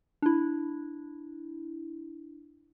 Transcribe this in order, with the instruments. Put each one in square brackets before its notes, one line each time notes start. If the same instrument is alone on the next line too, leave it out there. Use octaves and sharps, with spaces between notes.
[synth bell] D4 E4